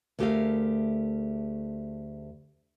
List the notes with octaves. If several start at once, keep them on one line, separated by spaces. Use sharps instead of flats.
D2 A3 G4 G#4 A#4 F5